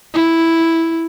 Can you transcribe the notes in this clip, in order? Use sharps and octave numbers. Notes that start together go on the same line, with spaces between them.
E4